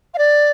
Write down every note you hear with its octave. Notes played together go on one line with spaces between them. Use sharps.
F5
D5